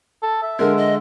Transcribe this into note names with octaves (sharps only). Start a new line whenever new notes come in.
A4
E5
D3 G#3 A#4
D#5